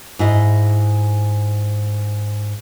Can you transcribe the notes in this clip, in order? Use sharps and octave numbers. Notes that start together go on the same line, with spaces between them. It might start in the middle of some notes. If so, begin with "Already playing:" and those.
G#2 E4 D#5